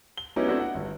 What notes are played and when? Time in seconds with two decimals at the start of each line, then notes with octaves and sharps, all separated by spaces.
0.17 G7
0.36 F#3 B3 C#4 D#4 E4 G4
0.48 A3 C4 D4 E4 F#4
0.60 F#5
0.75 G1